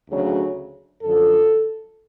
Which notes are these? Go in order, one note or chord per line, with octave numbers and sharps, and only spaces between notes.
D2 C#3 F#3
F#2 D3 F3 A4